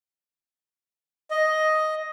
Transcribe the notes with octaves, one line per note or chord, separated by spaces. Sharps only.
D#5